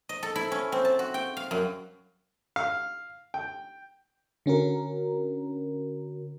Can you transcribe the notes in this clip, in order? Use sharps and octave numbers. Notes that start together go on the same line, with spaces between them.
D#5
A4
E4
C#4
C4
A5
F#4
G5
F5
F#2
F5
G5
D3 C#4 F#4 A#4